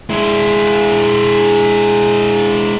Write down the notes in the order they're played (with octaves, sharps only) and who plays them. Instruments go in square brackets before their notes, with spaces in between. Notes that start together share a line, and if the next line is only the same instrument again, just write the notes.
[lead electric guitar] G#3 E4